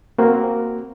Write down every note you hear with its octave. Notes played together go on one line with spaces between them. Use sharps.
A#3 C4 F#4 A#4